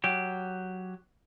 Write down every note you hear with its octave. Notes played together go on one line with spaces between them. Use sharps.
F#3 G4